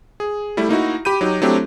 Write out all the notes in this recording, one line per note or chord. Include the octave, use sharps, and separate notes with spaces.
G#4
G3 A3 E4
A#3 D#4 E4 F#4
G4 B5 G6 D#7
F#3 D#4 G4
F#3 A3 C4 D4 E4 G4